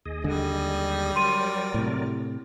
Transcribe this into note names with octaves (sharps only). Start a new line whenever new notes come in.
D#2 G#4 D#5
D3 G3 G#3
F#3 A#4 D5 C6 D#7
A2 C3